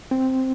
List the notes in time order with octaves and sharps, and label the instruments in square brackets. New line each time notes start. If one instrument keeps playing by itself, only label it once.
[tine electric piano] C4